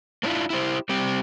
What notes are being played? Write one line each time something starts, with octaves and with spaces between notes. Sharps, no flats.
A#3 C4 D4 E4 F4
E4 G4 C5
G3 C4 G4